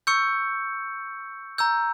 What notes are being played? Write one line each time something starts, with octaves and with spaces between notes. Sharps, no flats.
C#6 E6 G6 C#7
A#5 E6 G6